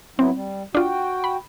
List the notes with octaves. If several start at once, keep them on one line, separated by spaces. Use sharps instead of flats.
F#3 B3 C4 E4
G3
D4 F4 F#4 G5
B5